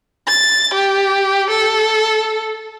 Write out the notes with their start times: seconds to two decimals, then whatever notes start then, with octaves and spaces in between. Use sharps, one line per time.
0.28 A6
0.74 G4
1.51 A4